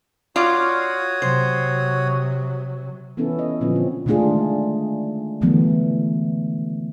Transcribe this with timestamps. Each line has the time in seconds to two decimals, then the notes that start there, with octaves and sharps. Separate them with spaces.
0.36 F4 F#4 C#5 D5 D#6
1.22 C3 F#3 C5
3.17 E3 B3 C#4 E4 A4
3.39 D#5
3.61 A#2 D3 F3 B3 C#4
3.76 C4
4.06 D#3 G#3 A3 D4 F4 G#4
5.41 B2 D3 E3 F#3 A3 B3